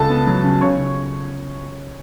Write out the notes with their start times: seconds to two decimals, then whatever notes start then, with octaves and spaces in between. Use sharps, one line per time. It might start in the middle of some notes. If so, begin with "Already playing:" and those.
Already playing: C#2 A4 A5
0.10 B3
0.27 F#3
0.44 C#3
0.61 C#3 C#5 C#6
0.77 C#3